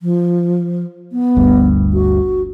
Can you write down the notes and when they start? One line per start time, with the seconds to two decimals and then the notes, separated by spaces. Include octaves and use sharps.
0.01 F3
1.12 B3
1.36 G1 D2 G2
1.94 F#4